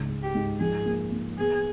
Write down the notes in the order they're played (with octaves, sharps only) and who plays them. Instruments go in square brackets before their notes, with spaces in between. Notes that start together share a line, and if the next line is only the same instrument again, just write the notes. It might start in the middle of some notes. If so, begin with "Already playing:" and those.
Already playing: [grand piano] C#2 G#2
G#3
[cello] G4
[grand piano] G#2
[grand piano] F3 [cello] G#4
[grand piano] A#3
A#3
[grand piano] B3 [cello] G#4